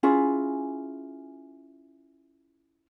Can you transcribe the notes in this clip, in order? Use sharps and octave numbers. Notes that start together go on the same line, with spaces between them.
C#4 E4 F4 G#4